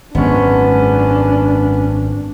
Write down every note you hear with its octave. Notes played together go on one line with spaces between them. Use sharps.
G#1 F#2 G#3 B3 C#4 D4